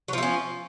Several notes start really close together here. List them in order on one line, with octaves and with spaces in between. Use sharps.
F#3 F3 A3 C#4